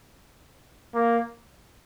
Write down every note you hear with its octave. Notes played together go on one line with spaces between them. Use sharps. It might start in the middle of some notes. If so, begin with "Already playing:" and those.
A#3